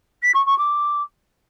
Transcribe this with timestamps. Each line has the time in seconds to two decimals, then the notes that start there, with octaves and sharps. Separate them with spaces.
0.22 B6
0.34 C#6
0.46 C#6
0.58 D6